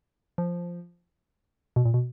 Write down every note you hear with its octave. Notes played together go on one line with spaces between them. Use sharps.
F3
B2
A#2
B2